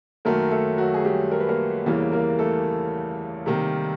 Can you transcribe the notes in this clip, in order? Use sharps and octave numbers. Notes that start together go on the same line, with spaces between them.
F#2 D#3 F#3 A3 A#3 A#4
A3 A4
F#3 F#4
G#4
G3 G4
A#4
B4
A#3 A#4
E2 C#3 E3 G3 A#3
A#3 A#4
A3 A4
C3 D#3 G3 A#3